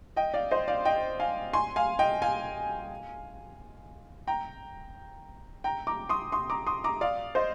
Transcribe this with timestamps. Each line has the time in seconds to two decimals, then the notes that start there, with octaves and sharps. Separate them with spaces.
0.16 D#5 G5
0.34 D5 F5
0.51 C5 D#5
0.68 D5 F5
0.85 D#5 G5
1.20 F5 G#5
1.53 G#5 C6
1.76 F5 G#5
1.99 D#5 G5
2.22 F5 G#5
4.27 G5 A#5
5.64 G5 A#5
5.87 A#5 D6
6.09 C6 D#6
6.32 C6 D#6
6.50 A#5 D6
6.66 C6 D#6
6.84 A#5 D6
7.01 D5 F5
7.35 C5 D#5